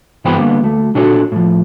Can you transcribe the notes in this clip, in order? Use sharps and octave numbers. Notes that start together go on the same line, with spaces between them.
G2 E3 B3 C5 G5 B5
D3 G3 A#3 B3
D2 A3
B1 A#2 D4 F#4 A4 C#5
A2 F3